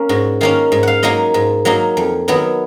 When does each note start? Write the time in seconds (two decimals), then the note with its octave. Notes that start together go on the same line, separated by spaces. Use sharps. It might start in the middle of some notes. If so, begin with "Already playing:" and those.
Already playing: A#3 C#4 A#4
0.09 G#2 F#4
0.41 D#3 A#3 C#4 F5
0.72 G#2
0.83 F5 F#5
1.03 F#3 A#3 D#4 D#5
1.34 G#2
1.65 F#3 A#3 D#4
1.97 F2
2.28 D#3 F#3 B3